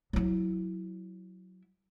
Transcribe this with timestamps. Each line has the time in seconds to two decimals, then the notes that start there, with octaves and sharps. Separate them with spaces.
0.13 F#3 E4